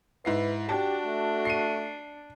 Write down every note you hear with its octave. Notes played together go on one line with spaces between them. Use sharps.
G#2 E4 B4 C7
D4 F#4 G4 A5
A3
C7 C#7 D#7